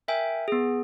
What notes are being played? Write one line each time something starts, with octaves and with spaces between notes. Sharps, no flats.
A#4 E5 G5 G#5
B3 G#4